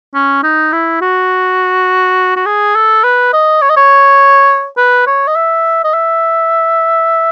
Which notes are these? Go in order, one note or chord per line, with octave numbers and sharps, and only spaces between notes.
C#4
D#4
E4
F#4
F#4
G#4
A4
B4
D#5
C#5
D#5
C#5
B4
C#5
D#5
E5
D#5
E5